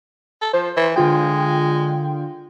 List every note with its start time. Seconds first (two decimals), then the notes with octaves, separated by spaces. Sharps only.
0.42 A4
0.53 F3 C5
0.76 E3
0.96 D3 G#3 F4 G5